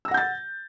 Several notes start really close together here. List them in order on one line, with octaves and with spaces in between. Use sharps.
E6 A#6 F#5 G6 A6